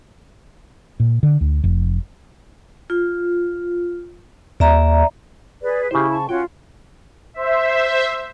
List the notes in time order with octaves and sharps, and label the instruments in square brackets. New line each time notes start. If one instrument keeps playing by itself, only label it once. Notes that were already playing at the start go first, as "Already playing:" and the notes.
[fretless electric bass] A#2
D3
D2
F1
[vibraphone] F4
[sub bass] D#2 [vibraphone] D5 E5 A#5
[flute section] G#4 B4 [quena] D5
[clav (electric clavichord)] C#3 C5 [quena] E4 [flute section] G4
[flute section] A5 C#6
[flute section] C#4 F#4 C#5 [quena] F4 [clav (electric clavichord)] G5
[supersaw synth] C5 E5